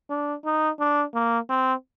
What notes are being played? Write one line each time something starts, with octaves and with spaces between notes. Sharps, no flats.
D4
D#4
D4
A#3
C4